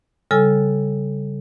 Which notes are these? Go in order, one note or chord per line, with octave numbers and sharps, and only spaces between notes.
C#3 G3 A4 G#5 E6